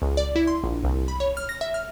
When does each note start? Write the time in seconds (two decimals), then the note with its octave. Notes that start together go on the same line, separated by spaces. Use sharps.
0.02 C#2
0.17 D5
0.36 E4
0.47 C6
0.64 A#1
0.83 C2
1.08 B5
1.20 C#5
1.37 F6
1.49 A#6
1.61 E5
1.74 F6